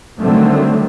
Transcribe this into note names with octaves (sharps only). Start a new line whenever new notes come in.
D3 D#3 F#3 G3 A3 C4